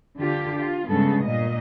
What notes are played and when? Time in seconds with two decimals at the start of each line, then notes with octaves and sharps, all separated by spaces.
0.18 D3 F4 G4
0.57 F4
0.89 G2 C#3 G#3 B3 A4
1.24 A#2 D#5